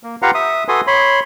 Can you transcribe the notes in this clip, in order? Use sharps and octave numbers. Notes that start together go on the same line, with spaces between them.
A#3
F4 G4 B4 F5 F#5 A#5
E5 D#6
F#4 A4 B4 G#5 C6 D#6
C#5 B5 C6